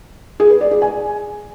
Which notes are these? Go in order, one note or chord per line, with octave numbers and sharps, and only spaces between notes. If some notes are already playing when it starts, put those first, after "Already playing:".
G#4
B4
D5
G#4
G#5